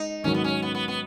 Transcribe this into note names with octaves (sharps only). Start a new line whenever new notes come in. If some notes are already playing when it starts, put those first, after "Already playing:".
Already playing: G#3 D#4
G#2 D#3 F#3 C#4
B3
C#4
B3
B3
B3